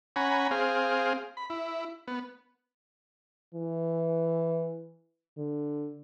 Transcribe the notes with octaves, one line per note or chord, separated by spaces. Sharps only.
C#4 F#5 G#5 A#5 B5
C4 G#4 F5
B5
E4
B3
E3
D3